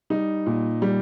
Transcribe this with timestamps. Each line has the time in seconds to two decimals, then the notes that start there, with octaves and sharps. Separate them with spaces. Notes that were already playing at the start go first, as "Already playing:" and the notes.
0.10 G3 D#4
0.46 A#2
0.82 G3